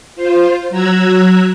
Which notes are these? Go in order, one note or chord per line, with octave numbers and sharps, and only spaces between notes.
F4 C5
F#3 A#5 E6 F#6 G#6